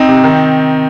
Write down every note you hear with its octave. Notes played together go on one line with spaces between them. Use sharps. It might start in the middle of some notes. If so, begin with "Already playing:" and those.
Already playing: C4 D#4
C3
D#3